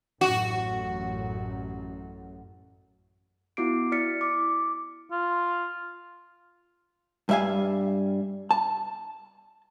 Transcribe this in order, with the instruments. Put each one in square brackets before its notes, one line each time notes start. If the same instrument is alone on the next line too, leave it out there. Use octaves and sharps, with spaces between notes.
[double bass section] A1 F#2 [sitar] F#4
[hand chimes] B3 E4 F#4 D6 C7 D7
E4 D5 F6 A6 B6 C#7
D6
[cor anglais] F4
[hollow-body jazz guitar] G2 G3 E5 F5 G#5
A5